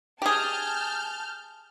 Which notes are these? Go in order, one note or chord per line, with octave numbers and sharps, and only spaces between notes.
G4 G#4 A5 F6 G6